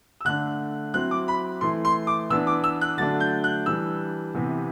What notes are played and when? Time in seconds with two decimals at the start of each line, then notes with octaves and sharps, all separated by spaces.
0.21 E6
0.25 D3 A3 D4 F#6
0.94 F#3 C4 E4 F#6
1.11 D6
1.28 B5
1.61 E3 A3 E4 C6
1.85 C6
2.07 D6
2.30 E3 B3 D4 E6
2.47 D6
2.64 E6
2.81 F#6
2.97 D3 F#3 A3 D4 A6
3.20 G6
3.44 F#6
3.66 E3 G3 D4 E6
4.35 C3 E3 B3